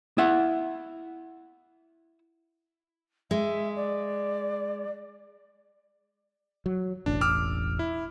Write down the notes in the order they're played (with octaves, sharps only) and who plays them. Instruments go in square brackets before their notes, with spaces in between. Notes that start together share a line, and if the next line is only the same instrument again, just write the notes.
[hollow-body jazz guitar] E4 E5 F#5
[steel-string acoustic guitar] G#3 [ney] E5
[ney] D5
[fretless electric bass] F#3
[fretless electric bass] E1 A1 [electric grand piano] D4
[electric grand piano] D6 E6 F6
E4